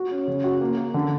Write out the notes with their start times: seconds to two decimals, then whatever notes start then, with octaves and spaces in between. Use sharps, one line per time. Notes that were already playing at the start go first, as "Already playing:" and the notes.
Already playing: F#4
0.11 C#4
0.27 C#3
0.44 F#4
0.61 A#3
0.77 A#3
0.94 D3